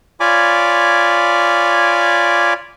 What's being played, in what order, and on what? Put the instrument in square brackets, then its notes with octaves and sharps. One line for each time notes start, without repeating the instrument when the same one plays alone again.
[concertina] F4 C#5 D5 G#5 B5 D6